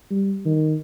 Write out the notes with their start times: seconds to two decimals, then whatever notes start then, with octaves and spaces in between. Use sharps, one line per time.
0.11 G3
0.45 D#3